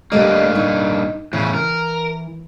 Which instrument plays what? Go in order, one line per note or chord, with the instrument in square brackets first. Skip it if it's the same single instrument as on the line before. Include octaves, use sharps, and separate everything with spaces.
[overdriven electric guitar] G2 A#3 [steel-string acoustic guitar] G3 A3 D#5
[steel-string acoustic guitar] D#4
[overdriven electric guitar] A2 C#3 [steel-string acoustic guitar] E3
[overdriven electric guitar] A#4